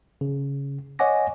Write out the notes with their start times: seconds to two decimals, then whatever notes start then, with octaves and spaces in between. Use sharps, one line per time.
0.21 C#3
0.99 C#5 D#5 F#5 G#5 D6 A#6